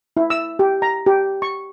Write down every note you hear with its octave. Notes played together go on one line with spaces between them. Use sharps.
E4
E6
G4
A#5
G4
C#6